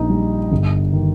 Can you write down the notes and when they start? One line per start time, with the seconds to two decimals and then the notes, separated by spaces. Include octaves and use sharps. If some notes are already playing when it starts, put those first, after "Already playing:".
Already playing: A#1 D#4 D#5
0.10 G3
0.52 G1
0.93 D#3